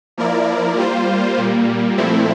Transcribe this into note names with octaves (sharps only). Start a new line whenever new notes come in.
F3 A#3 E4 A#4 D5
G3 A#3 F4 C5
A#2 G3 A#3
A#2 F3 A3 C4 E4